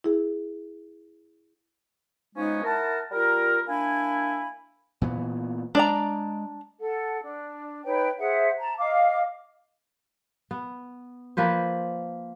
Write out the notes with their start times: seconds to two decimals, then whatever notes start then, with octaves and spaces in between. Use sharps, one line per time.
0.04 E4 G#4
2.35 F3 G#3 B3 C#4 D#4
2.63 E4 A#4 F#5 A5
3.11 G3 F4 A#4
3.67 A#3 D4 E4 G#5 B5
5.02 A#2 E3 B3
5.75 G#3 D4 D5 A#5
6.81 A4 F#5
7.22 D4
7.84 D#4 B4 C#5 G5
8.18 G#4 C5 E5 F#5
8.59 A5 A#5
8.78 D#5 F5 D6
10.51 B3
11.37 F3 A#3 B4 C5